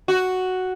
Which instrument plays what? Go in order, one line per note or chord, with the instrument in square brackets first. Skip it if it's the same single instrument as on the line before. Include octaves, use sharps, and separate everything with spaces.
[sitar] F#4